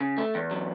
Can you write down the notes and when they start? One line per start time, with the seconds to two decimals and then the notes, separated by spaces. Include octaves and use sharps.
0.01 C#3
0.18 A3
0.35 E2
0.51 F#3